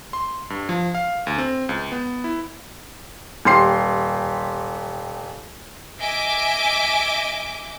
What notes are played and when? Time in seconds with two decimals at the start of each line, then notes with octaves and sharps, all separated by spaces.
0.13 C6
0.50 G2
0.69 F3
0.95 F5
1.27 D2
1.38 C4
1.69 C#2
1.92 B3
2.24 E4
3.45 D#1 G4 C6 C7
5.99 D#5 E5 G#5 D6 D7